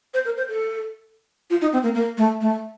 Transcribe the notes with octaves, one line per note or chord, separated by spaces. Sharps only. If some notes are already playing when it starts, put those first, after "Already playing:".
C5
A#4
C5
A4
F4
D#4
C4
A#3
A#3
A3
A3